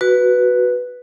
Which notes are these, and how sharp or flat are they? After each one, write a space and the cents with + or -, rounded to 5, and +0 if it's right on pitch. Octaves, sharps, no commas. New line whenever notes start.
F#4 +0 B4 +0